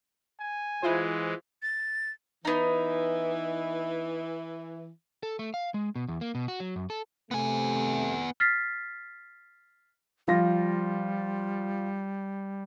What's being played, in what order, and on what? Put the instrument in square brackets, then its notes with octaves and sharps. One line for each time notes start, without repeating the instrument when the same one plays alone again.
[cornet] G#5
[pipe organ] E3 G#3 [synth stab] E4 F4 C5
[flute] A6
[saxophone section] E3 [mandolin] B3 D#4
[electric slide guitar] A4
A3
F5
G#3
B2
E2
A#3
B2
F#4
F#3
F#2
A4
[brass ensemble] C3 A3 [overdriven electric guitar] B3 G#5
[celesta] F6 A6 B6 C7
[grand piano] F3 F4 A#6 [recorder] G3